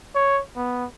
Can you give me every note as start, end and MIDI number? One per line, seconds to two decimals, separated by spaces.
0.15 0.41 73
0.56 0.86 59